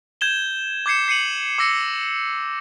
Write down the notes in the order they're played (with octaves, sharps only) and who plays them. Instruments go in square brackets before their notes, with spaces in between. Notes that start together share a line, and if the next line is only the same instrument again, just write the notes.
[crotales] G6 G#6 E7 G7
D6 G6 G#6 C7 C#7 E7
C7 C#7 D#7 F#7
D6 E6 A#6 C#7